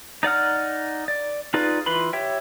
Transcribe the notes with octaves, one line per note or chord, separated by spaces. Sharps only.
D#4 D5 F#5 F6
D5
D#4 F4 G#4 B4 D5
E3 F4 B4 B5 C6
G4 C#5 E5 G5